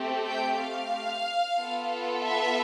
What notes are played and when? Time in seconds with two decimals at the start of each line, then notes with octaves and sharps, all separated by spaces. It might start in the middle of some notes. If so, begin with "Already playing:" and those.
Already playing: A3 C4 G4
0.26 G5
0.58 F5
1.58 B3 F4 A4
2.22 E5